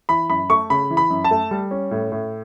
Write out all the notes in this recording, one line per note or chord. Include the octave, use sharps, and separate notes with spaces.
E3 B5
F#2 B5
A3 C#6
C#3 B5
E3
B5
F#2
A5
A3
G3
C#4
A2
A2